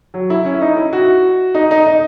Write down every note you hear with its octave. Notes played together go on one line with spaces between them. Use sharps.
F#3
E4
C#4
D#4
E4
F#4
D#4
D#4
D#4